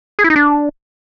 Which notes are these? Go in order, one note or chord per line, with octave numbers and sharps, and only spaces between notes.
G#4
E4
D#4
D4